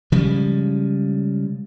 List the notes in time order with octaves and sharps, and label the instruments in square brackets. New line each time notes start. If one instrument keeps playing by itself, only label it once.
[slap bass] C#3 F3 G3 G#3